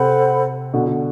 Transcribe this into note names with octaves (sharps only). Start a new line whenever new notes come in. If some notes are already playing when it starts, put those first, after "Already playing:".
Already playing: C3 A4 C5 F#5 B5
B2 D3
D3